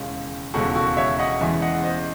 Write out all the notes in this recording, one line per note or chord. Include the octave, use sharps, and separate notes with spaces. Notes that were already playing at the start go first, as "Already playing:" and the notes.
Already playing: E1 D#2 C#3 G#3
E1 D#2 C#3 G#3 F#4 A4
F#4 A4
C#5 E5
D#5 F#5
E2 C#3 E3 G#3 E5 G#5
D#5 F#5
C5 D#5